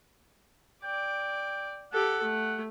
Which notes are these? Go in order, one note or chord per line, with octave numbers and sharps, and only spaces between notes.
D5 G5
G4 A4 F#5
A3